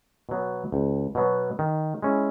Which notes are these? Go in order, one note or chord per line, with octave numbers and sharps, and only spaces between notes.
B2 F#3 B3
C#2
B2 F#3 B3
D#3
G#3 C#4 E4